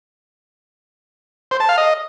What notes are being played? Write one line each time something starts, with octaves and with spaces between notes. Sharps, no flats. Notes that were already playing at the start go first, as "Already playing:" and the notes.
C5
A5
F5
D#5